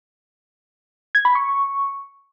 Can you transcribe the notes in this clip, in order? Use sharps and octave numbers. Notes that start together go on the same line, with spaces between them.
G#6
B5
C#6